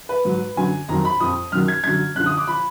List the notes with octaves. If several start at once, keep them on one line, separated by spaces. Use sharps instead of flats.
B4
G#2 F#3
F#2 D3 F#3 G#5
F2 D#3 F#3 A#5
B5
F2 F3 D#6
F#2 D#3 F#3 F6
G#6
F#2 D3 F#3 G#6
F#2 D3 F3 F#6
D#6
D6
F3 B5